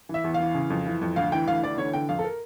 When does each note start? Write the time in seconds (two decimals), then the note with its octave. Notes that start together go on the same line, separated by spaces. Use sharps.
0.09 E3 E5
0.24 E2
0.34 F5
0.40 E3
0.55 C#3
0.70 F2
0.86 E3
1.01 F2
1.16 D2 F5
1.32 E3 G5
1.48 D2 F5
1.63 E3 D5
1.78 D3 C#5
1.93 D3 G5
2.09 F2 F5
2.19 A4
2.24 A#4